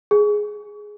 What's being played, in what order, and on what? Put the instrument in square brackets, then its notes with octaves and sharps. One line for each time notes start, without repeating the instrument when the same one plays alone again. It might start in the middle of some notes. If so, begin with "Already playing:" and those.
[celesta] G#4